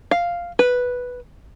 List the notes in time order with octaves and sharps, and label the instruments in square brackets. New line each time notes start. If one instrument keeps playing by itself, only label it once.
[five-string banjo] F5
B4